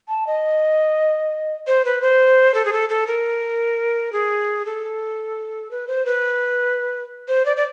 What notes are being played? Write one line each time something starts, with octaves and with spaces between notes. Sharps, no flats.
A5
D#5
C5
B4
C5
A4
G#4
A4
A4
A#4
G#4
A4
B4
C5
B4
C5
D5
D5